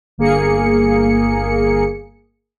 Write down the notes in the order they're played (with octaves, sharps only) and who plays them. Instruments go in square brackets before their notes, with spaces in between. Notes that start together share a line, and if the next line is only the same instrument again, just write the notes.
[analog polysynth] G1 A#3 G#4 C#7